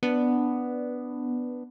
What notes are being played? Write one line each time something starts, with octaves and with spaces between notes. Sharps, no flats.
B3 D4